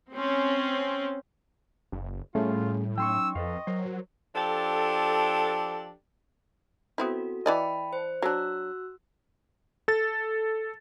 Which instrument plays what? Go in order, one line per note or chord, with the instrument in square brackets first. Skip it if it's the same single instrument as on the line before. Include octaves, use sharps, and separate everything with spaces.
[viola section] C4 C#4
[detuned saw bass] F#1
[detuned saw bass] A2 [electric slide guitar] G3 [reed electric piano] A3 C#4 G#4 [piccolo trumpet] F4
[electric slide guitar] F#3 C#4 D#4 [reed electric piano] G5 C6 C#6 [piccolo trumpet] E6
[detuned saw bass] F2 [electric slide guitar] A4 B4 F5 [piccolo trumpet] D#5
[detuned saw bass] F#3 [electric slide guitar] A#4 C5
[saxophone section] F3 D4 G4 A4
[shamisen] B3 C4 E4 [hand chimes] F#4 A4
[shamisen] E3 D5 D#5 [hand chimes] G5 A5 B5
[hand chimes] C5
[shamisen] F#3 D4 [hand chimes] F#4 E6 F#6
[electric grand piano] A4 A6